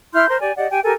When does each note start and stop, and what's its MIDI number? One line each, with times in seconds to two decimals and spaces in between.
0.14 0.28 64
0.14 0.28 84
0.14 0.28 89
0.14 0.28 91
0.28 0.40 70
0.28 0.40 72
0.28 0.40 84
0.41 0.52 67
0.41 0.52 74
0.41 0.52 80
0.57 0.67 67
0.57 0.67 74
0.57 0.67 75
0.57 0.67 78
0.71 0.80 67
0.71 0.80 79
0.71 0.80 80
0.83 0.92 67
0.83 0.92 69
0.83 0.92 70
0.83 0.92 80